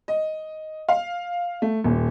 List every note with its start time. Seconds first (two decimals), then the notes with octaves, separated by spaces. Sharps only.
0.08 D#5
0.88 F5
1.62 A3
1.84 D#1